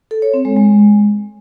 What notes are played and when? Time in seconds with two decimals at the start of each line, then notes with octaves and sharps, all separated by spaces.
0.11 A4
0.22 C#5
0.34 C4
0.45 G#3
0.56 G#3